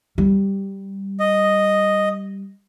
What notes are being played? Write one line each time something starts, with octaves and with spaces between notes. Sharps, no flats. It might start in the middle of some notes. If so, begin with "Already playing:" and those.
G3
D#5